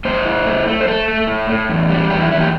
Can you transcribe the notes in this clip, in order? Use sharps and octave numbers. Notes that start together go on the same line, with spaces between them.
A2 C5
E4
A3
A3
C5
A3 A4
A3
A2
A2
E2
G3
E2 G4
E4
E2 E4
G4